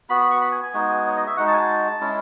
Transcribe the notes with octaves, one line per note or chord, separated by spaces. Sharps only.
B3 F#4 B5
B5
C#6
B5
G#5
G#5
G#3 B3 D#4 F#4
C#5
D#5
E5
G#3 D#4 F#4 F#5
A5
G#5
A5
G#3 C#4 E4